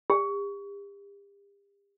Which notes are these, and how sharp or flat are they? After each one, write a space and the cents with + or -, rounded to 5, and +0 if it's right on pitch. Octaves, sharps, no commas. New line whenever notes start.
G4 +40